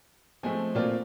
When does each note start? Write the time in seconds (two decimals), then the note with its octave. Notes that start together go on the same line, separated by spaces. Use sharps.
0.43 F3 G#3 A3 C4 G#5
0.75 A#2 A3 A#3 C4 F4 D5